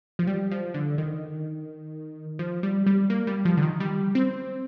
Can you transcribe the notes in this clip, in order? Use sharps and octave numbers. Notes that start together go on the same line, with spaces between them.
F3
G3
F3
D3
D#3
F3
G3
G3
A#3
G3
F3
D3
D#3
G3
C4